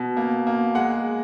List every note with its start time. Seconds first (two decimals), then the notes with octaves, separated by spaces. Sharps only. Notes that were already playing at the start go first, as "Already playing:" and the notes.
Already playing: B2
0.17 A#3
0.47 A#3
0.75 G#3 F#5